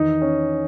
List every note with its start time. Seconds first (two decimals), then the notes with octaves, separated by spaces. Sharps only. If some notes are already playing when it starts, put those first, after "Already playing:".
Already playing: E2 D#3 D#4
0.22 C#4